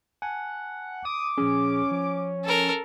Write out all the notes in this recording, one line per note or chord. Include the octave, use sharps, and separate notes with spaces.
F#5 G#5 A5
D6 D#6
A#2 F3 C#4 G#4
F3
A4 A#4